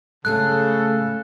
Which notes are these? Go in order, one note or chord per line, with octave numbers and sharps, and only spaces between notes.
A2 C#3 A3 G#4 A4 F#6